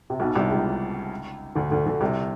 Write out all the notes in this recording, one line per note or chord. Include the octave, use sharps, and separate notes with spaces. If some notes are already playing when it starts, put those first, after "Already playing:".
C3
B1 B2
C2 C3
C#2 C#3
D2 D3
D2 D3
D2 D3
C2 C3